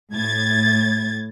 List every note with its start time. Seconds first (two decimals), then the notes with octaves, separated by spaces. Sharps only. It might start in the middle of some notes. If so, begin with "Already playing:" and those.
0.12 A2 G#6 A6